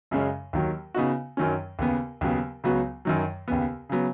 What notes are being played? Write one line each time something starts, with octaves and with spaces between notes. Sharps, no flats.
F#2 C#3 G#3 C#4
D#2 D#3 F#3
C#3 B3 D#4 F#4
F#2 D#3 F#3 C#4
D#2 C#3 B3
D#2 C#3 F#3 B3
C#2 C#3 F#3 B3 F#4
F#2 D#3 F#3
D#2 C#3 B3
C#3 F#3 B3